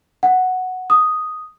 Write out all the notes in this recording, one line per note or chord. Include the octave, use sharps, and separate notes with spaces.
F#5
D#6